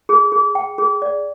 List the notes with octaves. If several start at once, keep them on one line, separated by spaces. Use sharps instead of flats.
G#4
G#4
G5
G#4
D5